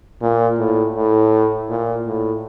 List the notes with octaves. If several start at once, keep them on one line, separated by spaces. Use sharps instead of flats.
A#2
A2
A2
A#2
A2